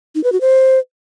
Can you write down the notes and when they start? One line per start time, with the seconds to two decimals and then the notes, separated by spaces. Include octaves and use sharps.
0.15 D#4
0.24 B4
0.32 F#4
0.41 C5